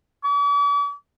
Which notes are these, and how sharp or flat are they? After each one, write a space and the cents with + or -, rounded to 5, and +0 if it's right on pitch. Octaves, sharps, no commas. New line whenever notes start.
D6 -45